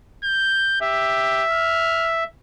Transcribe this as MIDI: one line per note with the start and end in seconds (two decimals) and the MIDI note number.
0.24 0.78 91
0.81 1.45 67
0.81 2.24 76
1.51 2.12 89